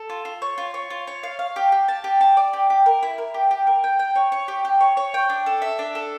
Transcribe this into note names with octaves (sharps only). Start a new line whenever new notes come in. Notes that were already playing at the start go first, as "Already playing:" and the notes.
Already playing: A4
F4
F4
C#5
F4
C#5
F4
C#5
F5
F5
G4
G4
A5
G4
A5
D5
G4
G4
A#4
E4
A#4
G4
G4
A#4
G5
G5
C#5
C#5
G4
G4
C#5
C#5
G5
D4
A4
E5
D4
A4